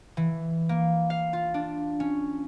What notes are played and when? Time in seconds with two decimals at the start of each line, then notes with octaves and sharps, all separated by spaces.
0.17 E3
0.69 A#3
1.10 F5
1.33 F4
1.54 D4
2.00 C#4